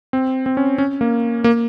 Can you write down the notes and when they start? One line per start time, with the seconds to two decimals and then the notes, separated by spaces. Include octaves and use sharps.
0.13 C4
0.46 C4
0.57 C#4
0.78 C#4
1.01 A#3
1.44 A#3